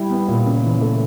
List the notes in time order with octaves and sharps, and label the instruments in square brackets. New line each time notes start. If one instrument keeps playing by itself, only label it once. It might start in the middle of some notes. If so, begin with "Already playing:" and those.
Already playing: [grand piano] G3 E4
B3
A#2
C#3
E3
A3